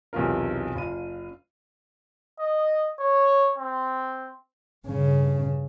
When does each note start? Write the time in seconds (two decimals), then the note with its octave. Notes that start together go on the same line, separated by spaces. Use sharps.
0.13 B1 E2 C3 F4 A#4
0.75 F#1 F4 D#7
2.40 D#5
3.00 C#5
3.58 C4
4.87 G2 C#3